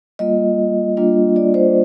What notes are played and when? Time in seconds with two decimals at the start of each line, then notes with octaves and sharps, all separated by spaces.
0.19 G3 A#3 F4 D#5
0.97 G3 A#3 D4 F4
1.36 D5
1.54 C5